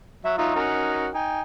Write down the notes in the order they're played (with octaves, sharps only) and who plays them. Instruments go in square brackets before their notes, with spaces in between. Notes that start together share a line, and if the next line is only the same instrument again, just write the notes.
[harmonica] F#3 [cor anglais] E5
[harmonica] F#3 F4 E5 [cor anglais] D#4
[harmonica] C#4 F#4 A#4
[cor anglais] D#4 [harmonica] G5 G#5